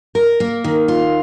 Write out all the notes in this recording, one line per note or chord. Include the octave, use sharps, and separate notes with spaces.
A#4
A#3
D#3
F4